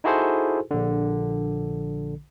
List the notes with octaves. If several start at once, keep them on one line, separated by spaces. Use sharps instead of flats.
D#4 E4 F#4 G#4 A4 C5
A#1 D3